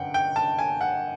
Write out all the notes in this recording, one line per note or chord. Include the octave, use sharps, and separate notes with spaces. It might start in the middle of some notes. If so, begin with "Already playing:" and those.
Already playing: G1 F#2 D3 F#5 G5
G5
A5
G#5
F#5